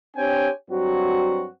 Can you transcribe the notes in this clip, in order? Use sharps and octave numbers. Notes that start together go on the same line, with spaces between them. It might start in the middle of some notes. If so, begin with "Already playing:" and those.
C4 D4 G4 C#5 G5 G#5
G2 F#3 C4 F#4